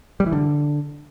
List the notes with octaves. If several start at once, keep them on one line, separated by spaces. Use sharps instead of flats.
G3
E3
D3